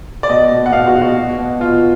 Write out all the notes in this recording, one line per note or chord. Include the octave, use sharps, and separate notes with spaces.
D5
B2 D#5
B2
F#5
B2 F5
F#4
B2
F#4
B2
B2
B2 F4